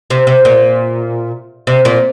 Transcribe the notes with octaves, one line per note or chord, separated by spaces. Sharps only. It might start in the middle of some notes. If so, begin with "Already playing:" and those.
C3
C3
A#2
C3
A#2